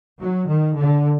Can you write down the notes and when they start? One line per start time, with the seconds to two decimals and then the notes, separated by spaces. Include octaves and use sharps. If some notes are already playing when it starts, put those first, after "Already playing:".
0.19 F#3
0.46 D#3
0.75 D3